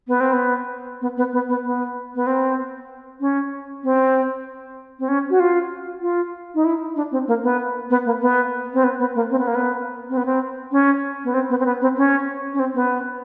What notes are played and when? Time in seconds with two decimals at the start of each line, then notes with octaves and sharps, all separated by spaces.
0.08 B3
0.20 C4
0.33 B3
1.01 B3
1.17 B3
1.33 B3
1.49 B3
1.65 B3
2.15 B3
2.27 C4
3.20 C#4
3.84 C4
4.99 C4
5.09 C#4
5.30 F#4
5.40 F4
6.02 F4
6.55 D#4
6.65 E4
6.96 D4
7.12 C4
7.28 A#3
7.43 B3
7.90 B3
8.06 A#3
8.22 B3
8.74 C4
8.84 B3
8.99 B3
9.15 A#3
9.31 C4
9.39 B3
9.47 A#3
9.55 B3
10.09 C4
10.17 B3
10.26 C4
10.72 C#4
11.24 B3
11.34 C4
11.50 B3
11.59 C4
11.66 B3
11.81 C4
11.97 C#4
12.54 C#4
12.59 C4
12.75 B3